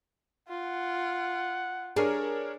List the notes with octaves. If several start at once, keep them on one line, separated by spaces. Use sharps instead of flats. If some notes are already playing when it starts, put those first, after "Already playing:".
F4 F#5
D4 G#4 A#4 C#5